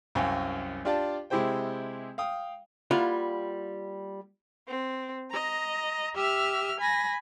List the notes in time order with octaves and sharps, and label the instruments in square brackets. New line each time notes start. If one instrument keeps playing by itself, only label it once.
[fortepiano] C2 F#2 F5 G5 G#5
D4 F4 G4 D5 A5
C3 G#3 E4 G4 C5 G5
F5 G5 D#6
[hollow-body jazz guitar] G3 A#3 E4 F4 F5 F#5
[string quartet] C4
D#5 A#5
G4 E5 F6
G#5 B5 A#6